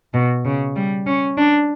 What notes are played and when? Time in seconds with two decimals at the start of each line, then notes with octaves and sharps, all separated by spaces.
0.14 B2
0.45 C#3
0.76 G3
1.06 C#4
1.37 D4